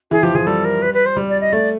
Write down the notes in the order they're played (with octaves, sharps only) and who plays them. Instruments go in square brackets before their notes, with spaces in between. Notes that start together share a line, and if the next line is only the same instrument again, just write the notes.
[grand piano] E3 [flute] G#4
[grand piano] F3 [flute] G4
[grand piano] F3 [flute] G#4
[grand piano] G3 [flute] A4
[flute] A#4
B4
B4
C5
[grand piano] G3
[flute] D5
D#5
[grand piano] A3 [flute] D5